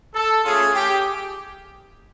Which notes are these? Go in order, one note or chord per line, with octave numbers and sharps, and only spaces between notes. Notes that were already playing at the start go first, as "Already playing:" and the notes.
A4
A3 C#4 F4 G#4
G4